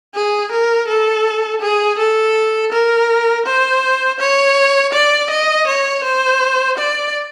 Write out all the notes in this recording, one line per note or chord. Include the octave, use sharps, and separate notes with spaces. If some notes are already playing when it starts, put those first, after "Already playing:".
G#4
A#4
A4
G#4
A4
A#4
C5
C#5
D5
D#5
C#5
C5
D5